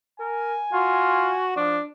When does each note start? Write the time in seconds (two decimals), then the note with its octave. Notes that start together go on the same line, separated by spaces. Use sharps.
0.20 A#4 G#5
0.73 F4 F#4
1.57 F3 D4